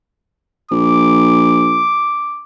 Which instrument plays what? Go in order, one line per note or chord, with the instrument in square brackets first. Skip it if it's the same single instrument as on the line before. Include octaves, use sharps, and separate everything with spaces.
[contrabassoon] A#1 [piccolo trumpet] D6